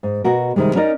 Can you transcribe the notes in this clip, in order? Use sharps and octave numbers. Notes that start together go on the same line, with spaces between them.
G#2
B2 F#4 A#4
C3 D#3 G3 G#3
C#4 D#4 A#4 D5 D#5